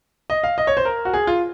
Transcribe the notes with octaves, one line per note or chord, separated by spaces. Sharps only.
D#5
F5
D#5
C#5
C5
A#4
F#4
G#4
F4